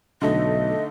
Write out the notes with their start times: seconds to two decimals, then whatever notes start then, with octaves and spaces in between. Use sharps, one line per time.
0.22 B1 D3 A3 D#4 D#5